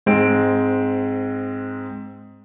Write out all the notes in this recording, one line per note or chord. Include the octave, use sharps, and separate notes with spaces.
G#2 G#3 C4 D7